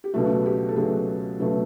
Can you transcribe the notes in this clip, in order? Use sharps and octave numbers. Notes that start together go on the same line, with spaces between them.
G4
C#2 B2 F#3 A3 F#4
G4
A4
C#2 B2 F#3 A3 G#4
C#2 B2 F#3 A3